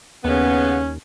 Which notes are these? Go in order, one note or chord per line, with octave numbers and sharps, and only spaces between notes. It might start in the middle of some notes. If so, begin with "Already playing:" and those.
D#2 C#3 B3 C#4